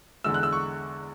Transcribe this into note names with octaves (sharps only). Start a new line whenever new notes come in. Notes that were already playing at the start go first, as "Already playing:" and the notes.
E2 D3 G#3 E6
F#6
E6
C#6